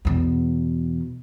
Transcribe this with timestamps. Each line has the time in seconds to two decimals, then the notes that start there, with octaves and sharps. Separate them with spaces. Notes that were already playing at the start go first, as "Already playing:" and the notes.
0.05 E2 B2